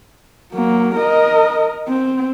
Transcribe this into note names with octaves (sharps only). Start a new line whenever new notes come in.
F#3 A#3
A#4 D#5
C4